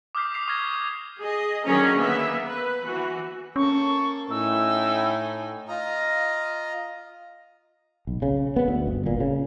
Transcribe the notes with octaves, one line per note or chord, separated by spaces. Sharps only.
D6 D#6 F6 G6 B6 C7
D6 D#6 B6 C7 F7
C#6 D6 F6 G#6 A#6 G7
F6 F7
G#4 D#5
D3 D#3 F#3 C#4 G#4 A#5
A#3 B3 E5
B4
E3 F#4
A#3 C#4 A4 C#6
A2 D#4 G#5 E6
F4 D#5 A#5
B1
C#3
B3
D2
G1
A#2
C#3